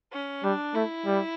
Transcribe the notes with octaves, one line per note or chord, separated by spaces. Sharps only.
C#4
G3 D4
A3 E4
G3